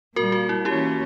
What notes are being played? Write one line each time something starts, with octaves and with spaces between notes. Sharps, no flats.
A#2 G3 A#3 F#4 A#4
F#4
E4
E3 A#3 C#4 E4 G4